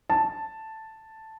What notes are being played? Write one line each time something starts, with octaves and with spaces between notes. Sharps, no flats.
A5